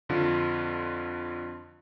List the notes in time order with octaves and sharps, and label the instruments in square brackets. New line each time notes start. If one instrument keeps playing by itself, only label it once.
[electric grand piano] F2 D3 F4